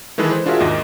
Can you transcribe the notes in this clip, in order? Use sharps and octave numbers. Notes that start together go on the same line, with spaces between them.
D#3 E3 G#3 G#4 A4 B4
C5
D4 F4 F#4 G#4 A#4 E5
D#2 G#2 D#5